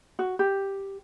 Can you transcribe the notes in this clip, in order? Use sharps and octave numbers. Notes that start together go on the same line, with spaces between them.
F#4
G4